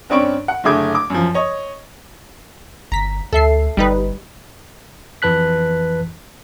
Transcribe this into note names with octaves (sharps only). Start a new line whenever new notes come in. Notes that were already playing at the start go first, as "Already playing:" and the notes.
G2 C4 C#4 D5 C#6 D7
F#5
F#1 D3 A3 G#4 D6 G#6
D6
F#2 F3
C#5 D#5
G1 A#5 B6
D2 A4 E5 C7
G1 G3 D#4 B4
F2 E3 B4 A5 F#6 B6